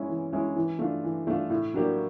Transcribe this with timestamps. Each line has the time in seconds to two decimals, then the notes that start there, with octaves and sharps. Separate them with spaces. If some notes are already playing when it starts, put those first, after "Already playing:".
Already playing: G#3 C#4 E4
0.09 E3
0.33 G#3 C#4 E4
0.56 E3
0.79 A3 D4 F4
1.04 E3
1.27 A3 D4 F4
1.50 A2
1.74 F#3 A#3 D4 G4